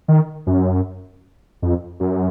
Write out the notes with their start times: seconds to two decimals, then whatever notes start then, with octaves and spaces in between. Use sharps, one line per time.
0.08 D#3
0.47 F#2
1.62 F2
2.00 F#2